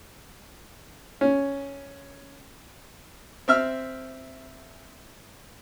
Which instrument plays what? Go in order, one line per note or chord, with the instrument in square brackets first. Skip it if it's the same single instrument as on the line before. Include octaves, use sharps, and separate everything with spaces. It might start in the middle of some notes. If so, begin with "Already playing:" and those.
[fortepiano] C#4
C4 E5 F6